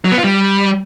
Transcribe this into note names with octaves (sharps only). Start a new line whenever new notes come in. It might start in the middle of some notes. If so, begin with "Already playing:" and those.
F#3
B3
F4
G3